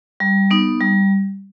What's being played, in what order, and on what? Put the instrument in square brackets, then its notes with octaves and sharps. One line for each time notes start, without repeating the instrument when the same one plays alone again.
[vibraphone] G3
B3 D#4
G3